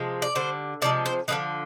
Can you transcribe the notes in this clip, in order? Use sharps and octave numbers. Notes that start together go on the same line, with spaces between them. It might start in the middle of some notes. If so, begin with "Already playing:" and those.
Already playing: C3 F3 G#3
D5
D3 G3 C5
C3 F3 G#3 D5
C5
D3 F3 G#3 B4